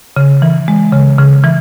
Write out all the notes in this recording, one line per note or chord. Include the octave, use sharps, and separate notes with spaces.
C#3
E3
G#3
C#3
C#3
E3